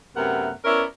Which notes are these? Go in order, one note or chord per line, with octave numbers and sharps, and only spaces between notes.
F#2 C3 A3 B3 A#4 F#5
B3 C#4 E4 A#4 D5 E5